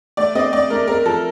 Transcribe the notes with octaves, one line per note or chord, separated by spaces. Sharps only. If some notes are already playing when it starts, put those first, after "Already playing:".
A3 D5
C4 D#5
A3 D5
A3 A#4
C4 A#4
F3 A4